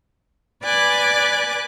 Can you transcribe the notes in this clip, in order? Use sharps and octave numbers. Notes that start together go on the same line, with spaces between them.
B4 D5 G#5 D6 F#6